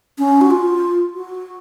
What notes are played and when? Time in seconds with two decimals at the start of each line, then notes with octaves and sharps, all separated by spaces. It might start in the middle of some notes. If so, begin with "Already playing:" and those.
0.18 C#4
0.41 F#4
0.51 F4
1.15 F#4